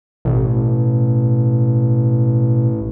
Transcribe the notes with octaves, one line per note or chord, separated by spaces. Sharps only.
A1 B2